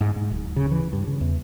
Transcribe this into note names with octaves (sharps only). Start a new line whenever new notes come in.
G#2
G#2
D1
C#3
E3
G2
C#3
E2